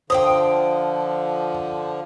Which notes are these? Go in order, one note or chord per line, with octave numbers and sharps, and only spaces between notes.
D3 F3 C5 G5 C6 D#6